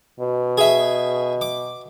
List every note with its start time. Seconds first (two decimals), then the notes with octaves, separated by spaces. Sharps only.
0.20 B2
0.57 G#4 E5
1.41 D6